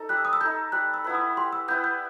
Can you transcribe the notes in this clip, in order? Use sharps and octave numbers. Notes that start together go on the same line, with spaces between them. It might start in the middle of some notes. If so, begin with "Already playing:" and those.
Already playing: D#4 A4
G3 F#6
E6
D#6
E6
D#4 A4 G6
G3 F#6
E6
B3 E4 B4
D#6
G3 C6
E6
B3 E4 B4 G6
G6